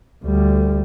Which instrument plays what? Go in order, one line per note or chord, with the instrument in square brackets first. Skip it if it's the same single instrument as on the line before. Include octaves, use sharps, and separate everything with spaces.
[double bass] D2 G3